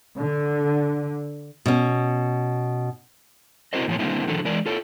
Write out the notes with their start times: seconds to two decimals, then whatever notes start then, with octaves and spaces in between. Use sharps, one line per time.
0.18 D3
1.66 B2 C#4
3.73 C4 E4 F#4 A#4 C5 D#5
3.88 A2 E3 F3 A#3 F4 C#5
3.99 D3 D#3 G3 A#3 C4 E4
4.28 D3 D#3 F3 F#3 A4
4.45 E3 G#3 A#4 D5
4.66 F4 A4 C#5